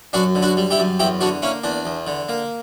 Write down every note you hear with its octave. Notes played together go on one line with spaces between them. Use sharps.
F#2 D4 F#4
D3
D4 F#4
G3
E4 G4
F#2
E2 E4 G4
D3 D4 F#4
A#3 C#4 E4
E2 D4
E2
D3
A#3